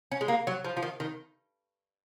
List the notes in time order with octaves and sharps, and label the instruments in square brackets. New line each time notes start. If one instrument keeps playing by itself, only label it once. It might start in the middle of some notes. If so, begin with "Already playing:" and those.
[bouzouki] C#4
G#3
A#3
F#3
F3
F3
D#3
D#3